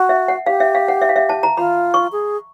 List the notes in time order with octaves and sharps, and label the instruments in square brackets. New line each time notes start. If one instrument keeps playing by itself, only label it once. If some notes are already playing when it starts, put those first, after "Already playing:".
Already playing: [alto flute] F#4
[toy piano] E5
F#5
[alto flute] G4 [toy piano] F5
[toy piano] E5
F5
F#5
E5
F5
E5
A5
A#5
[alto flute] F4 [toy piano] B5
[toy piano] C#6
[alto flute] G#4